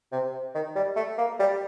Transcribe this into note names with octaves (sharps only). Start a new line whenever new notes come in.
C3
D#3
G3
A3
A#3
G3